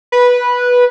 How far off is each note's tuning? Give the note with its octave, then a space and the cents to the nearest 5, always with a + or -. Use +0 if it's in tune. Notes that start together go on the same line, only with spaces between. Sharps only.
B4 -10